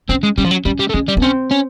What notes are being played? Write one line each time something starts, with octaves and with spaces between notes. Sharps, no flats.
C4 C#4
G#3
G3 C#4
F3
F#3
G3 C#4
G3
A3
G#3 C#4
G3
B3
C4 C#4
C#4